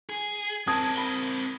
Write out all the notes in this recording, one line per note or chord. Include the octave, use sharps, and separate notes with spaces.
G#4
C4 A#4 A5 D#6 G#6
B5 G7